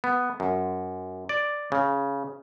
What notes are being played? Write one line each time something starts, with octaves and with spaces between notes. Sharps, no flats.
B3
F#2
D5
C#3